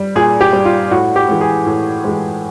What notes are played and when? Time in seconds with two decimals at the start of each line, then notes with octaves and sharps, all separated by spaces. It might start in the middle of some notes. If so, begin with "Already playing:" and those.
Already playing: G3
0.16 A#2 G#4
0.41 G4
0.53 G3
0.65 F4
0.91 A2 F#4
1.16 G4
1.29 E3 G#3
1.41 G#4
1.66 A2
2.04 E3 G#3